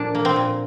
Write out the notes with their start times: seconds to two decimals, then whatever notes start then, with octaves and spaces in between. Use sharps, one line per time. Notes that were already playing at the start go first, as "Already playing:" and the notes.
Already playing: A#2 F3 D4
0.15 A#3
0.25 C4
0.36 A#2